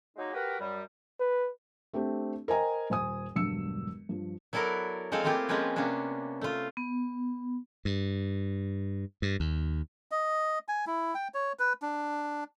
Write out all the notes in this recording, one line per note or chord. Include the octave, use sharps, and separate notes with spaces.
F#3 G#3 A#3 D#4
F#4 G4 A#4 B4
F#2 G3
B4
A3 C4 D4 G4
A#4 C5 D#5 G5 G#5 A#5
D#1 C5 G#5 D#6
E1 G2 D3 F#3 E6 C#7
G2 F3
F#3 B3 E4 A4 A#4 D5
F3 G#3 C4 A4 F5
A3 A#3 C4 E4 F4 G4
F3 G#3 A#3 C4 C#4 B4
C3 A#3 B3 C#4 D4
A3 F4
B3
G2
G2
D#2
D#5
G#5
E4
G5
C#5
B4
D4